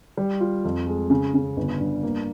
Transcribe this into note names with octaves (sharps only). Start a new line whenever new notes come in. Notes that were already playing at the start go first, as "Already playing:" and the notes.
G3
F4
F2
G#3
C#3
C#3
G1
G2
A#3